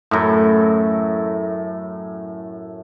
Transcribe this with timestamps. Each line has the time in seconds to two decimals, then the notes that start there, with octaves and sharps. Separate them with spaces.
0.11 F#2 A2